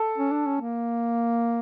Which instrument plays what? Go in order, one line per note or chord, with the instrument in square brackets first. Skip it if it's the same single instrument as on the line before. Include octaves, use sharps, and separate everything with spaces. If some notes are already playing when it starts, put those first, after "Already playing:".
Already playing: [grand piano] A4
[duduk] C#4
D4
C#4
A#3